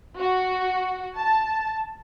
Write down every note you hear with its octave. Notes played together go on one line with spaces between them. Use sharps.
F#4
A5